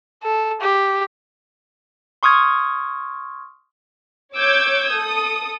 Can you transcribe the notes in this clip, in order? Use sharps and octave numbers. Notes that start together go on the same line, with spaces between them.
A4
G4
C6 C#6 D#6 F6 G#6
C#5 D6 E6 G6 G#6
A4 D#6